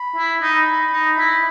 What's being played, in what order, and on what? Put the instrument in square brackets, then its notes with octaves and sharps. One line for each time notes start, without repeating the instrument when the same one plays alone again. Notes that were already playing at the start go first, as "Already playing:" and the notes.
Already playing: [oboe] B5
[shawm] E4
[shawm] D#4 [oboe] B5
[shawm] D#4
E4